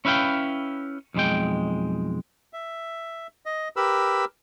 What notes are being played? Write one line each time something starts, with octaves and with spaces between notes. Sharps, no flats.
C#4 E4 B4 F5 G5
B1 F2 B2 G#3 G5
E5
D#5
G4 A#4 B4 B5 E6